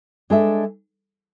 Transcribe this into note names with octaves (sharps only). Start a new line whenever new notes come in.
G#3 D4 A4 E5